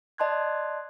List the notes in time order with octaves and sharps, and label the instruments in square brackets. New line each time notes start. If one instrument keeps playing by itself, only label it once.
[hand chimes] D5 D#5 A5 C6 F#6 G#6